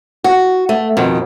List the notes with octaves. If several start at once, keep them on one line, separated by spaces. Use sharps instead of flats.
F#4
A3
F2 B2 D#3